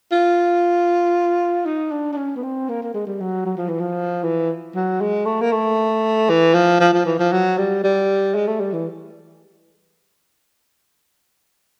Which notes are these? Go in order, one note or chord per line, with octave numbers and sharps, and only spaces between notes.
F4
D#4
D4
D4
C#4
B3
C4
A#3
A#3
G#3
G3
F#3
F#3
F3
E3
F3
E3
F#3
G#3
A3
A#3
A3
E3
F3
F3
F3
E3
F3
F#3
G3
G3
G#3
A3
G3
E3